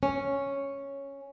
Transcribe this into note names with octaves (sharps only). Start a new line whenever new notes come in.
C#4